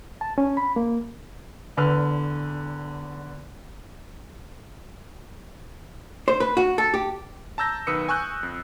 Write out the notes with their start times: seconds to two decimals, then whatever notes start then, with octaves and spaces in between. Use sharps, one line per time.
0.21 A5
0.38 C#4
0.57 B5
0.76 A#3
1.77 E2 D3 B4 F6
6.28 C5
6.40 B4
6.57 F#4
6.78 A4
6.94 G4
7.58 A5 A#5 E6 G6 A#6
7.87 B1 D#3 B4 D#6 E6 C#7
8.09 G#5 C#6 E6 F#6 G6
8.43 F2